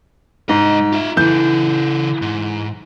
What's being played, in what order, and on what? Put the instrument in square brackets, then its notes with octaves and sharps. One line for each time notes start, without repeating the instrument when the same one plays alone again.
[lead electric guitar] C2 D#5 [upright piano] G#2
[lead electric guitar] F4 E5
[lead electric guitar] C#3 A4 [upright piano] E3 G6
[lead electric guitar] G#2